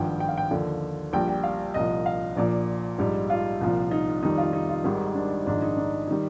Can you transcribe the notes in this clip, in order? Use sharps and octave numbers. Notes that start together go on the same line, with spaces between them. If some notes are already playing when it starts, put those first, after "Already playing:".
Already playing: G#1 G2 F3 G5
G5
F5
G5
D#2 D3 F3
A#1 A#2 G3 G5
G5
F5
C2 A#2 F3 D#5
F5
A#1 A#2 F3 D5
A#1 G#2 G3
F4
C2 A#2 F3
D#4
F2 D#3 G3 D#4
F4
D#4
F4
G#1 G#2 D#3 G3
D4
A#1 G#2 D#3 D4
D#4
D4
D#3 G3 D#4